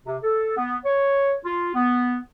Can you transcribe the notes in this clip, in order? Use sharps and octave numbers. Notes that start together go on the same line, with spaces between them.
C3
A4
B3
C#5
F4
B3